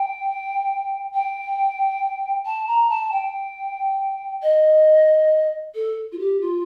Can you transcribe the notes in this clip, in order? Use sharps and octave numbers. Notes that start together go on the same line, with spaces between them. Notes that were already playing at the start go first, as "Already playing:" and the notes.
Already playing: G5
G5
A5
A#5
A5
G5
D#5
A4
F4
G4
F4